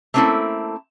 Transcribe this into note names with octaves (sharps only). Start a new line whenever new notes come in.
A3 A#3 C4 C#4 E4 A4